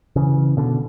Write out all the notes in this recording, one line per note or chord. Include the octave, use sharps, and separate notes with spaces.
C#3 E3
B2 D3